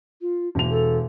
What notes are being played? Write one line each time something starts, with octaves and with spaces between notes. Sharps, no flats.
F4
E1 A#3 F7
A4